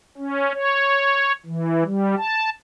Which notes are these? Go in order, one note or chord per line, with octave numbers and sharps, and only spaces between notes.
C#4
C#5
E3
G3
A5